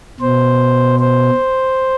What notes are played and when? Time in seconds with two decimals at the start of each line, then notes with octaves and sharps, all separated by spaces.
0.20 B2 C5
0.99 C5